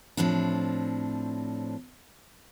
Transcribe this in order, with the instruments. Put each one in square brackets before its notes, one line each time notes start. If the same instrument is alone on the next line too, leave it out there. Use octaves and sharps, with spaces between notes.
[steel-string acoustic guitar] A2 F3 C4 D4